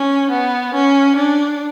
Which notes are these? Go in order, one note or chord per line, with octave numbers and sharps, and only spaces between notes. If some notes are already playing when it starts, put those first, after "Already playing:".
Already playing: C#4
B3
C#4
D4